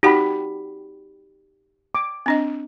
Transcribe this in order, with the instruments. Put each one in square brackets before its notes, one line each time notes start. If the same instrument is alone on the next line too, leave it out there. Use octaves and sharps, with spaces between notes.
[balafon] D#4 F#4 G5 [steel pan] G4 F#5 B5
[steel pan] D6
[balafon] C4 D4 D#5